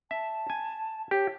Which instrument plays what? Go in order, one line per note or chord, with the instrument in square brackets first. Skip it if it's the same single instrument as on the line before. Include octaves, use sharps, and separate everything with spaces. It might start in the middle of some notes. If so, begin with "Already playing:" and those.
[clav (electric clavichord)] E5 [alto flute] A5
[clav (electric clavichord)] G#5
[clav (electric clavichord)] G4 [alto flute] C#5